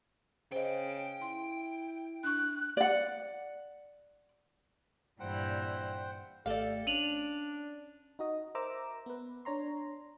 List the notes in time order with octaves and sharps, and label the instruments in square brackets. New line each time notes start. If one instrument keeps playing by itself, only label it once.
[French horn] C#3 [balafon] C5 D#5 [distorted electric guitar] G5
[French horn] E4 [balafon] C6
[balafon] D4 C#6 [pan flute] F#6
[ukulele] D5 F#5
[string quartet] G2 A#2 E3 [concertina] C5 F#5 G5
[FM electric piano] G#1 A3 [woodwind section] G4 A4 [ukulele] D5 F5
[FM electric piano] C#4 [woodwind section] D4 [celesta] D#7 F7 F#7
[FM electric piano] D#4 F#4 D#5
A#4 C5 E5 A#5 D6 E6
B3 B4
D4 C#5 A#5 C6